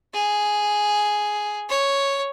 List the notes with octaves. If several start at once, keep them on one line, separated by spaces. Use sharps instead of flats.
G#4
C#5